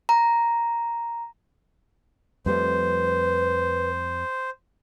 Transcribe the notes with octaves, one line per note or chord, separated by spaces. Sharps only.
A#5
F2 G3 A3 B4 C5